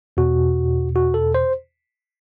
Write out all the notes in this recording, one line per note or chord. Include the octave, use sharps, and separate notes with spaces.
E2 B2 F#4
F#4
A4
C5